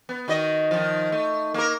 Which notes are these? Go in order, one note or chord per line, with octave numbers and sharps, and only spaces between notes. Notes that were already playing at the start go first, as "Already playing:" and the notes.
B3
D#3 F#4 D#5
D#3 F3
A3
A#3 A#4